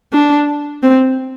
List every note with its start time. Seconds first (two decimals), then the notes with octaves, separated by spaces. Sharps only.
0.13 D4
0.83 C4